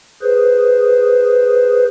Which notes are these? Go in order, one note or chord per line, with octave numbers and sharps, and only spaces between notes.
G#4 B4 C5